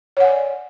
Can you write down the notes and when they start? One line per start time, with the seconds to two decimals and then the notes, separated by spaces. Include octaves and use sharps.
0.17 C#5
0.20 F#5
0.24 G#5
0.28 D5